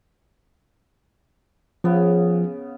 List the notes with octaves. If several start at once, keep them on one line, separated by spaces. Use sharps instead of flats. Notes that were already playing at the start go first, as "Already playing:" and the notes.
C#3 F3 B3